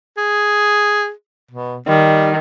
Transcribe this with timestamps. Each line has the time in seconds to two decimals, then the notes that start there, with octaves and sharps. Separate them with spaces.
0.17 G#4
1.51 B2
1.88 D#3 G3